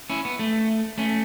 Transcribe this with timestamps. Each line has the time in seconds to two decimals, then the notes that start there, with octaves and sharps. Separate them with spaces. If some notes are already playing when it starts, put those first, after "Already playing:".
0.10 C#4 E4
0.25 B3
0.39 A3
0.98 A3 C#4